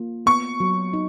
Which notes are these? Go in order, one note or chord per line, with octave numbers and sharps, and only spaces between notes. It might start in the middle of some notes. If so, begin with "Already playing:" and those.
Already playing: A#3 F4
B3 C#6
F#3
D#4